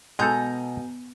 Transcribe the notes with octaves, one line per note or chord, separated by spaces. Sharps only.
B2 G#3 D#4 A4 G#5 A#5 G6